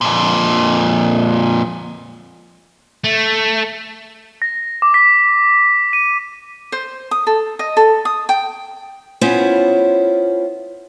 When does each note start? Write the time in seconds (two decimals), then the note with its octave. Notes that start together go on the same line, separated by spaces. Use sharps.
0.01 F2 A#2
3.04 A3
4.42 A#6
4.82 D6
4.94 B6
5.93 D#7
6.72 C5
7.11 D#6
7.27 A4
7.59 D#5
7.77 A4
8.05 D#6
8.29 G5
9.21 B3 C#4 E4 F4 C5 C#5